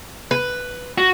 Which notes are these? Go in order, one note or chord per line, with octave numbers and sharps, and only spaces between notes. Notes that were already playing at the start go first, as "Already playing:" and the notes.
B4
F#4